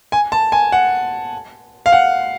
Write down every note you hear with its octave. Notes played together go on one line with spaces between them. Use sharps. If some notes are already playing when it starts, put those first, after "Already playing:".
G#5
A5
G#5
F#5
F5
F#5